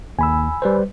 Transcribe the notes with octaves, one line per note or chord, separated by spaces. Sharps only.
D#2 G#5 B5 E6
G3 B4 C5